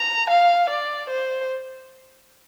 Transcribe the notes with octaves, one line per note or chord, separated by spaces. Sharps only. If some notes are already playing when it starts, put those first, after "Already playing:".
Already playing: A#5
F5
D5
C5